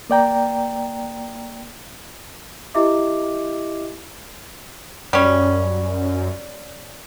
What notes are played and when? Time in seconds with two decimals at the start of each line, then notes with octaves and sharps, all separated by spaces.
0.10 A#3 D5 G5 A#5
2.74 E4 G4 D#5 E5 D6
5.13 F#2 G3 C#4